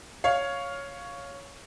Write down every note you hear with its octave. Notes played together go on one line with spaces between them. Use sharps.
C#5 F5